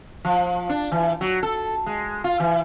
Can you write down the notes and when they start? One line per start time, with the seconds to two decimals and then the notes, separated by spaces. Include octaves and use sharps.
0.25 F3
0.69 D4
0.92 E3
1.21 F#3
1.43 A4
1.86 G#3
2.24 F4
2.40 E3